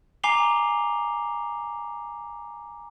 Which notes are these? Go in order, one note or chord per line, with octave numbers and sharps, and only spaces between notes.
G#5 A#5 D6 C7 F7 G7